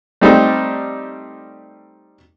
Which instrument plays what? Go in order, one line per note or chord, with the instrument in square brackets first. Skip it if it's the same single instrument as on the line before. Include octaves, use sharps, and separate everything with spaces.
[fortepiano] G3 A3 C4 D#4 G4